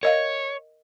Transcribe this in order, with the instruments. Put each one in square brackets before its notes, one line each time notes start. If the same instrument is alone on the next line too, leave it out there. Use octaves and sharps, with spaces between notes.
[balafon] A#4 D#5 F5 [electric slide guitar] C#5